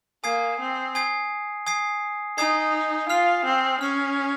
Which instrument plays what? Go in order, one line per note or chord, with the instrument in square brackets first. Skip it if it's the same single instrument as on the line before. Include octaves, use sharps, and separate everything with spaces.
[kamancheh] A#3 [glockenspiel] G#5 D#6 G#6 C7
[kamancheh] C4
[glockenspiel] G#5 D#6 G#6 C7
G#5 D#6 G#6 C7
[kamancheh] D#4 [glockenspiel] G#5 D#6 G#6 C7
[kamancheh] F4 [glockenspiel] F6 C7 F7
[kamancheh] C4
[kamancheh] C#4 [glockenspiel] F6 C7 F7